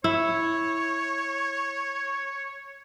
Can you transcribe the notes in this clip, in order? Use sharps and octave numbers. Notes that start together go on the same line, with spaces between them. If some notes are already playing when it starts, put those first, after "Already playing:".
E4 C#5